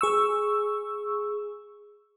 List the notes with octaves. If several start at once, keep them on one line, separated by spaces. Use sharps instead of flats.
G#4 C#6 E6